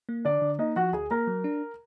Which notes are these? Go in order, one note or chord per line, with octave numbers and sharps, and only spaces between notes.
A#3
D3 D4 D5
D3
A#3 D#4 D#5
F3 F#4 F#5
D2 G#4 G#5
A#3 A#4 A#5
F#3
D4